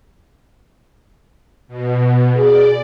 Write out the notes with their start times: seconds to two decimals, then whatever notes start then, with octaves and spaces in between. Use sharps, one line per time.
1.68 B2
2.36 G#4 D5